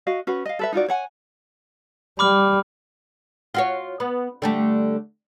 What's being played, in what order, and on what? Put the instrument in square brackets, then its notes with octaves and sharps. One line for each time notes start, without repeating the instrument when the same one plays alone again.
[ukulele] F#4 D#5 F5
C#4 F#4 B4
D#5 F5
A4 B4 E5
D#4 F4 F#4 D5
C#5 F#5 G#5
[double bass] G3 [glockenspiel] B5 D6 F6
[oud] F4 F#4 C#5
B3
D3 G3 A3